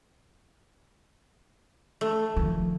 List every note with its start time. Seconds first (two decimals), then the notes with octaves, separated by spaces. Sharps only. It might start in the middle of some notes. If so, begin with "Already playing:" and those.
2.01 A3
2.36 D#3 F3